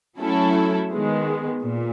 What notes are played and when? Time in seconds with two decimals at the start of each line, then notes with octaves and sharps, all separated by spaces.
0.18 F#3 A3 C#4 E4 A4
0.90 D#3 G#3 B3
1.61 A#2